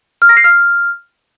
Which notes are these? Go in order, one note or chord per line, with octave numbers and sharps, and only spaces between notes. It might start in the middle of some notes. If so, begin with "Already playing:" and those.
F6
A#6
C7
F6